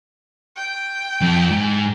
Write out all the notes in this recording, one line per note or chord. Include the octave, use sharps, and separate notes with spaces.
G5
F2
G#2